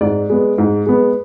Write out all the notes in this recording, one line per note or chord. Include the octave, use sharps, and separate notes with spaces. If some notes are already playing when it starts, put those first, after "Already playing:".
G#2 D5
G#3 B3
G#2
G#3 B3